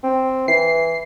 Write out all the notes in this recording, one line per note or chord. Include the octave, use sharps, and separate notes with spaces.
C4
E3 C7